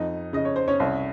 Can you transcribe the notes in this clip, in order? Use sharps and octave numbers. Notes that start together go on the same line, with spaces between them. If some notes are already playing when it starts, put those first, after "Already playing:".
Already playing: F2 D#4 D#5
C#3 D#5
C#5
C5
C#4 C#5
C2